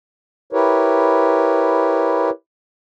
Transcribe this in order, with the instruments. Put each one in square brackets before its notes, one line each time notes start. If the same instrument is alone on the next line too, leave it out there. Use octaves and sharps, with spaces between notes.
[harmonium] E4 G4 A#4 B4 C#5